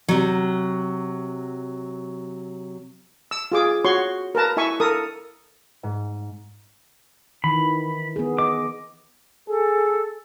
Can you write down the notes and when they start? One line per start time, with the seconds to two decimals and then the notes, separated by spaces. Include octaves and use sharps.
0.08 C3 F#3
3.31 E6
3.52 F4 G#4 D6
3.85 F#4 C#5 C6 C#6
4.35 A#4 B4 A5 A#5
4.57 E4 E5 G#5 C#6
4.80 A4 A#4 D#6
5.83 G#2
7.44 D#3 E3 B5
8.16 B3 G#4
8.39 D#5 D6
9.48 G#4 A4